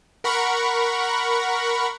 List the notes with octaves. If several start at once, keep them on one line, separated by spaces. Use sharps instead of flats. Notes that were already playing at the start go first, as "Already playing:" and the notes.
A#4 F#5 B5 C#6